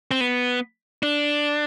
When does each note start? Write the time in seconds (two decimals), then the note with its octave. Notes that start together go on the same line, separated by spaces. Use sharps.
0.11 C4
0.21 B3
1.03 D4